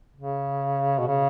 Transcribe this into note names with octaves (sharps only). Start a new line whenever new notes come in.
C#3
B2
C#3